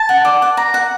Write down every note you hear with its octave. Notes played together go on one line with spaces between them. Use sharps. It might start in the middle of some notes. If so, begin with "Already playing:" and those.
Already playing: A5
F#5
D5
F#5
A#5
F#5